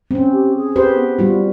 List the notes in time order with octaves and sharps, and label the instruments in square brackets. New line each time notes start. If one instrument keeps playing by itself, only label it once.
[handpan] C4 C#4
[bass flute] G4
G#4
[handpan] G4 B4 C5
[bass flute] B3
[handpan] G3 F4 F#4